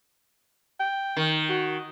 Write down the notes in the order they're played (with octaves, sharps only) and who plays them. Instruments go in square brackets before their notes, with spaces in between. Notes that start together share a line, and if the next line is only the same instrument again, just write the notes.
[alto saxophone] G5
[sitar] D#3
[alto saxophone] F#4